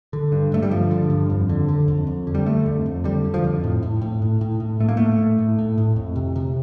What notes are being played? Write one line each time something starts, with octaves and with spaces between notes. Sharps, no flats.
D3
G2
G2 A3
G3
D3 F3
D3
G2
F2
D3
D3
F2
F2
D3
G3
D3 A3
F2
F2
D3 G3
D3
F3
F2
A2
A2
A2
A2
A2
A2
A2 A3
A#3
A2 A3
A2
A2
A2
A2
F2
C3
C3